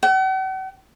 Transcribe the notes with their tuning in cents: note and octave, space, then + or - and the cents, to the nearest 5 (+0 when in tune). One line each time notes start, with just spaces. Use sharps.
F#5 +45